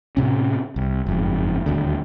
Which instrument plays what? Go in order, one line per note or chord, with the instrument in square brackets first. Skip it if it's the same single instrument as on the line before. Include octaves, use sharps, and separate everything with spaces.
[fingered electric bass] A2 C3 C#4
C2
F#1 F2 G#2
D#1 D2 D3